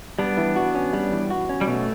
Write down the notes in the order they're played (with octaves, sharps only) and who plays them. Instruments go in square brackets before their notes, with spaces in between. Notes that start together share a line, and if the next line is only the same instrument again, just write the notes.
[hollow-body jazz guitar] G3 [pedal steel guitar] B3 D4
[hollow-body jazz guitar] E3
F#4
C#4
G3
E3
F#4
C#4
[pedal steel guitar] G3
[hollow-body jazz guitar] B2 [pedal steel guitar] A3